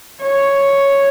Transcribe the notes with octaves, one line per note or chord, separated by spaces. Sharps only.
C#5